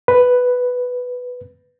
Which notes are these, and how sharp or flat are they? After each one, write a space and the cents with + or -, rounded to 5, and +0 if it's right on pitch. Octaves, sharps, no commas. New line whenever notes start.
B4 +5